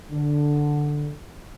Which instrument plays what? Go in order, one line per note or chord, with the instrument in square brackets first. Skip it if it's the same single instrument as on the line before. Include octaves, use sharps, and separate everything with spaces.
[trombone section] D3